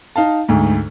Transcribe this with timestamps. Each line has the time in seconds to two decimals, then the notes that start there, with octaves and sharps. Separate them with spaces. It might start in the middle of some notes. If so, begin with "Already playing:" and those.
0.16 D#4 F5 A5
0.49 D2 G#2